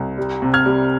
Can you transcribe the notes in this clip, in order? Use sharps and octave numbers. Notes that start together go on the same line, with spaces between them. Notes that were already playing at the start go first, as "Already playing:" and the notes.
Already playing: C2
G3
C3
F6 G#6
G3